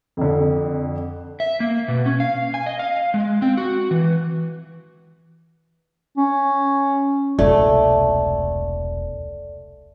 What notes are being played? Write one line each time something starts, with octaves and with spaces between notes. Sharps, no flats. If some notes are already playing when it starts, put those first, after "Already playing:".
F2 D3
E5
A#3
B2
C#4
F5
G#5
D#5
F5
G#3
C4
F#4
E3
C#4
E1 C2 A3 D5